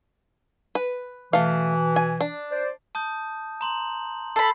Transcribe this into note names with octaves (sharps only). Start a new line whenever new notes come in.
B4
B2 E3 A3 F5
G#5
D4
C5 D5
A5 D#6 G6
A#5 C6 F#7
A4 B5 C7